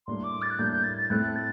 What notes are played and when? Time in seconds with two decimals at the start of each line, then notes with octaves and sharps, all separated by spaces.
0.07 A2 G3 A#3 D4 C6
0.24 D6
0.42 A6
0.50 F#6
0.59 A2 G3 A#3 D4 G6
0.72 G6
0.84 A6
0.98 A6
1.10 A2 A3 C4 F#6
1.36 A6